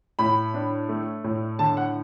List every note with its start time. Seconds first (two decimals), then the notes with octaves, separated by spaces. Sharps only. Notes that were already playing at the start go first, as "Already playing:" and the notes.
0.19 A2 B5
0.54 D4
0.89 A3
1.24 A2
1.59 D3 A5
1.77 F#5